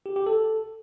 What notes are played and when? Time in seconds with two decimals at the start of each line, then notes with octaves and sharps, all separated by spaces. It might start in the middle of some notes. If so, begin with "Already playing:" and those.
0.06 G4
0.16 G4
0.26 A4